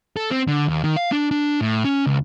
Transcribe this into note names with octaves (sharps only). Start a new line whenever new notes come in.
A4
C4
D3
D#2
D#3
F5
D4
D4
A2
C#4
C#2